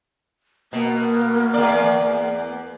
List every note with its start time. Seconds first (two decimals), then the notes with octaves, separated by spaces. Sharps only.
0.73 B2 A#3
1.54 E2 D5